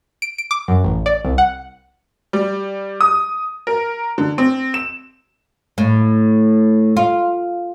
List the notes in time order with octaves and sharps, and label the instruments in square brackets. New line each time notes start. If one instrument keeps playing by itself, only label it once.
[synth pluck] D7
D7
D6
F#2
A1
D5
C2
F#5
[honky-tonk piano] G3
D#6
A#4
D3
C4
E7
[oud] A2
F4